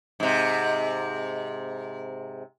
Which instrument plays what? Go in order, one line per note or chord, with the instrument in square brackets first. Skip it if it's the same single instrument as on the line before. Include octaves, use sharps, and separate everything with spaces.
[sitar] G#2 C3